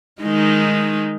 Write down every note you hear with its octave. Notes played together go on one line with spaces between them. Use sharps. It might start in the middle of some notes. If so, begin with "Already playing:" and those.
D#3 G#3 D#4